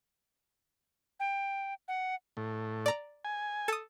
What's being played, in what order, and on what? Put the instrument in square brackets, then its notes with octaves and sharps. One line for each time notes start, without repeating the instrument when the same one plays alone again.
[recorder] G5
F#5
[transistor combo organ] A2
[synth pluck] D5 A#5
[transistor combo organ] G#5
[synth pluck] A4 D#6